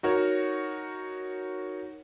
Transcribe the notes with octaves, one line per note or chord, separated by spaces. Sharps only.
D#4 F#4 A#4 C#5